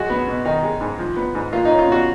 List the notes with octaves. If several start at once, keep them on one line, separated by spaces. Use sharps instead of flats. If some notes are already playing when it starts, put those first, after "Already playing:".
Already playing: F#2 G#3 F#4
B3
B2
D#3 D#4
G#3
G#2
F3
B3
G#2
A#3 F4
D#4
C#4
F4
B2 F#4